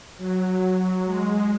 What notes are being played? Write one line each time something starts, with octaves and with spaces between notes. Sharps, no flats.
F#3
G#3